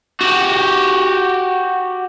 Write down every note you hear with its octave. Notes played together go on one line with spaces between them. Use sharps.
F#4 G4